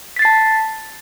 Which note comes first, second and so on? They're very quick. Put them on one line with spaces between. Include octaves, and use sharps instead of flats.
B6 A6 C7 A5